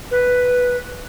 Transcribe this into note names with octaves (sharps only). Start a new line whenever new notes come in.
B4